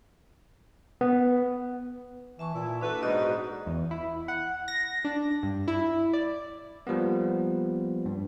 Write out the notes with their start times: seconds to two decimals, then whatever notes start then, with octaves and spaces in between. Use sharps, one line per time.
1.01 B3
2.39 E3 E5 A5 C#6
2.54 A#2 E4
2.81 A#3 D4 F#4 A4 B4
3.01 G#2 B2 D#4 D5 D#5 A#5
3.66 E2
3.91 E4
4.28 F#5
4.68 A#6
5.05 D4
5.43 G2
5.68 E4
6.13 D5
6.87 F3 G3 A#3 B3
8.05 G2